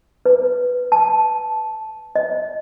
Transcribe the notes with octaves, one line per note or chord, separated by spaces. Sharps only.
B4
A5
D#5